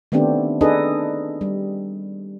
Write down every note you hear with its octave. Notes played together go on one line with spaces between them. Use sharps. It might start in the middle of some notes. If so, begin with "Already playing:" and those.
D#3 A3 B3 C4 D4 G4
D4 D#4 G#4 A4 B4 D#5
G3